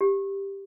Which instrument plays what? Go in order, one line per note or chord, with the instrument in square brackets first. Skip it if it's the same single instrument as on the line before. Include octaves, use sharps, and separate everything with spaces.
[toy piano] G4